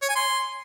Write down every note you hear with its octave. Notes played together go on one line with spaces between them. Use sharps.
C#5
G#5
C6